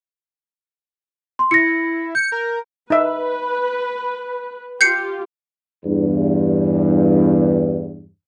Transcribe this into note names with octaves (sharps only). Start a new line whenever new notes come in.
C6
E4 A#6 C#7
G6 C#7
A#4
D#4 B4 E5
F4 G4 G6 C7 C#7
E2 G2